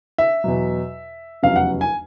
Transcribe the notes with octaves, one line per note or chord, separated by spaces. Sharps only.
E5
E2 B2 F#3
F1 E2 C#3 F#3 F5
F#5
G#5